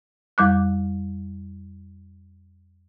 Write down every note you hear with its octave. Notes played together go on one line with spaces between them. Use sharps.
F2 G3 D6 F#6